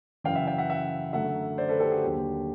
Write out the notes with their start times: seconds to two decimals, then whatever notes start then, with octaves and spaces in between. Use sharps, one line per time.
0.24 F#2 C#3 E3 F5 G5
0.35 E5 F#5
0.47 F5 G5
0.58 E5 F#5
0.70 E5 F#5
1.13 F#2 D3 F#3 A3 E5 F#5
1.58 C5 D5
1.69 A4 B4
1.80 G4 A4
1.92 F#4 G#4
2.02 D#2 D3 F#3 G4